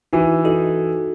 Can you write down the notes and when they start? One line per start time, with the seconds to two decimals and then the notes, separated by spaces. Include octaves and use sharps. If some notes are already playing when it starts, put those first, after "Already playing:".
0.13 E3 D#4 F#4
0.45 D#4 F#4 A4